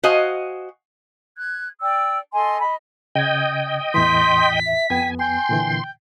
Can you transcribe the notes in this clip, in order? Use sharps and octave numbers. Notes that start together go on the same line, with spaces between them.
F#4 C5 D#5 F5 G#5
F#6 G#6
D5 G5 E6
A4 D#5 G#5 C6
D#5 B5
C#3 D#5 G5 G#6
E2 A2 E3 C6 B6
E5
F2 B3 G5 G#5
G5 G#5 C6
A#2 D3 E3